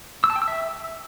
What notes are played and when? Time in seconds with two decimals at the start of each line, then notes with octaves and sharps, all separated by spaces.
0.24 E6
0.30 A5
0.36 G5
0.42 E6
0.48 E5